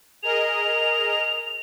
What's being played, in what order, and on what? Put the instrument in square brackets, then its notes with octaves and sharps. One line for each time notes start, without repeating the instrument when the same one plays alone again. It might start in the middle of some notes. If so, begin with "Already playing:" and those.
[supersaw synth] G#4 A#4 D#5 [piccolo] F7